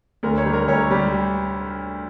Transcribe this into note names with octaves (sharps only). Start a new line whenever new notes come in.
D2 A#4
C#5
G3
A#4
D2 C#5
G3